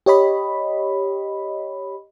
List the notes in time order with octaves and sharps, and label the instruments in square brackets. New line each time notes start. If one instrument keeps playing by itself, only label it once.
[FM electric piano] G4 C#5 D#5 B5